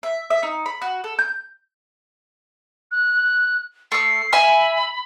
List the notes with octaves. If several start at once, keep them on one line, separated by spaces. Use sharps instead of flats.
E5
E5
D#4
B5
F#4
A4
G6
F#6
A3 E6 C7
E5 G#5 B5 E6